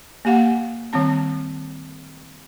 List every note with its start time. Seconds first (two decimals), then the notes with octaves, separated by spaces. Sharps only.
0.25 A#3 G4 F5 F#5
0.93 D#3 G3 C4 A5